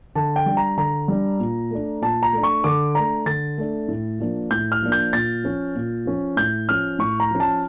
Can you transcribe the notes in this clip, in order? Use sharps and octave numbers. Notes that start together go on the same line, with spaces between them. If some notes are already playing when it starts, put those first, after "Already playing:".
D3 A5
G5
G3 D4
A#5
D3 A#5
G3 D4
A#2
A3 D4
A#2 A5
A#5
A3 D4
C#6
D3 D6
A3 D4 A#5
D3 A6
A3 D4
A2
F3 A#3 D4
A2 G6
F6
F3 A#3 D4
G6
A#2 A6
F3 C#4
A#2
F3 C#4
A2 G6
F3 C#4 F6
A2 C#6
A#5
F3 C#4
A5